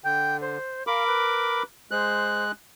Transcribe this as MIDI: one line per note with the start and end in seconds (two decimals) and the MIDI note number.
0.04 0.58 50
0.04 0.37 79
0.41 0.86 72
0.87 1.63 70
0.87 1.07 77
0.87 1.63 83
0.87 1.63 86
1.07 1.64 71
1.91 2.52 56
1.91 2.44 72
1.91 2.52 90